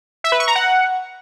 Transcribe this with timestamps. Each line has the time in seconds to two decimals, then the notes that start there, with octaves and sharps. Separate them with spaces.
0.24 E5
0.32 B4
0.40 C#6
0.48 A#5
0.55 F#5